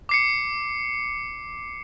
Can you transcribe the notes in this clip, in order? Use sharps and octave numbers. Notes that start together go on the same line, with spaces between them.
D6 C7 C#7